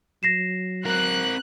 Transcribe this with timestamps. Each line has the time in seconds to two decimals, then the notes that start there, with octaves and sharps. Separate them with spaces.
0.23 F#3 A#6 C7 E7
0.86 C4 A#4 F#6